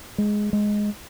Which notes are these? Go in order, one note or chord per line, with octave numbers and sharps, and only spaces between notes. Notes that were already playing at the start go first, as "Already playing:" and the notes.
G#3
G#3